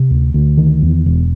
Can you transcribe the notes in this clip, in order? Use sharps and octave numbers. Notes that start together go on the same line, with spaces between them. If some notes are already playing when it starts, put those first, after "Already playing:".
Already playing: C3
D2
D2
D#3
E2
E1